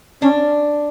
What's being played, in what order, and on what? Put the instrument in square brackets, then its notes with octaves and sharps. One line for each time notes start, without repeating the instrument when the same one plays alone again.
[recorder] C#4 [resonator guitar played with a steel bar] D4